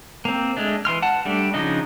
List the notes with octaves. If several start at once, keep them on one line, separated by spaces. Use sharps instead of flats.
A#3 C4
G#3 A3 D4
E3 C6 F6
F#5 A5
G3 A3 D4
C#3 F3 D4 D#4 D#5